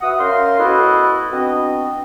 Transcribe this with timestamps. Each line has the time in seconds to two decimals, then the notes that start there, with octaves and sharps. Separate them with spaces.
0.01 F#4 B4 E5 F#5 D#6
0.19 C#4 A#4 D#5 F5 C6
0.58 B3 E4 F#4 A4 B4 D#5
1.33 B3 C4 D4 F#4 D#5